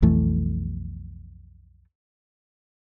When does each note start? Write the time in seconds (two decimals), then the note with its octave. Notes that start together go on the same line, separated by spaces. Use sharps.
0.02 B1 F2 E3 A3